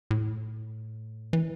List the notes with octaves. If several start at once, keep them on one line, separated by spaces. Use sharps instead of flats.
A2
E3